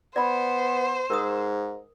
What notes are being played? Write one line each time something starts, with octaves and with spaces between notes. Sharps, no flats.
B3 C5 D5 B5
G#2 A#4 D#6